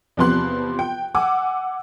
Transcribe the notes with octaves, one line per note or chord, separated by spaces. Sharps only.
E2 C3 F3 B3 C6 F#6
G5
F#5 G#5 D6 E6